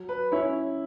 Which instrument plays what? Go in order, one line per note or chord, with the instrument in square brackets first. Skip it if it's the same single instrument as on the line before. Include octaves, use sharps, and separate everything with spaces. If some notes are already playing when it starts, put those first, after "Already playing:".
Already playing: [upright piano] F#3
[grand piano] B4
[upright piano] C#4 E4 [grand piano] C#5